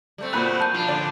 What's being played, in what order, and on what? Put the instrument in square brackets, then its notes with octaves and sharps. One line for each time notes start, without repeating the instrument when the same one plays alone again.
[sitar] G3 A3 C4
[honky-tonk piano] A#2 B5 F#6 [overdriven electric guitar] F#4 G#4
[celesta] A5 G6
[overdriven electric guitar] F3 D4 [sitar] F4
[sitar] D3 [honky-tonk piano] D5